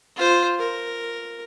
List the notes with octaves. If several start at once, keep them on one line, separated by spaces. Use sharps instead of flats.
F4 C5
A#4